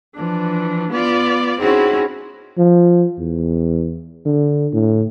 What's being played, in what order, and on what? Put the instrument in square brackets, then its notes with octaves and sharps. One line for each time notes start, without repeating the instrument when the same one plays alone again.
[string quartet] E3 F3 D4
B3 F4 D5
C4 C#4 D#4 E4 F#4 G#4
[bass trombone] F3
E2
D3
A2